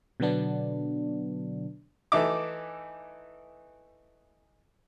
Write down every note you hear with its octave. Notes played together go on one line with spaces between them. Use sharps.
B2 D3 F#3 B3 D4
E3 A3 D#4 E5 D6